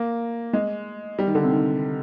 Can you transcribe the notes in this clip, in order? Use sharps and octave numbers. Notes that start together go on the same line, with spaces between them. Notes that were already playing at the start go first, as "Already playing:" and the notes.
Already playing: A#3
G#3
G3
D#3
D3
C3
D#3